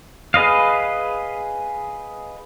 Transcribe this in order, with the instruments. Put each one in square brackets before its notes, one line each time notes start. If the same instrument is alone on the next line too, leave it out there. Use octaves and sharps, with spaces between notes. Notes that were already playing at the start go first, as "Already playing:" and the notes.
[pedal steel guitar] G#4 B4 D#5 F5